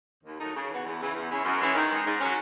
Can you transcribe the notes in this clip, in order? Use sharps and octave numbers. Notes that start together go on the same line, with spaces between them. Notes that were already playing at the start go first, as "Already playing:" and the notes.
D#2
D#3 F#3 A3 D#4
C#3
E3 B3 F#4
E2
C#3 E3
E2
C#3 G#3 C#4 E4
F#2
E3 G#3 C#4 E4
D#3
G#3 D#4
G#2
F#3 C#4